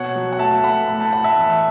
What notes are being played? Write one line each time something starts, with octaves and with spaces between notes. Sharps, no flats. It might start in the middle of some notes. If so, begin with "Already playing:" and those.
Already playing: B2 C#5 F#5
F#3
F#5
A3 E5 A5
A3 F#5 B5
A2 B5
A5
A2 F#5
E5 A5
E2